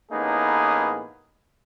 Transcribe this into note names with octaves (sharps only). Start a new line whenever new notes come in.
A1 A2 A#3 B3 D#4 G#4